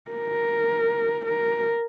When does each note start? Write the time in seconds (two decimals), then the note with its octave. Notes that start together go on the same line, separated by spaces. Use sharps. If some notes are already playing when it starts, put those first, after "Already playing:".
0.11 A#4
1.26 A#4